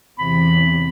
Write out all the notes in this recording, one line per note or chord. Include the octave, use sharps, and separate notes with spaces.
E2 C3 B5